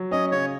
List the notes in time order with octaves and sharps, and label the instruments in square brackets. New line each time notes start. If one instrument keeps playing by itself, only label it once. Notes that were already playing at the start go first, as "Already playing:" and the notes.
Already playing: [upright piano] F#3
[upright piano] C#4 [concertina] D#5
[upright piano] C#3 [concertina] C#5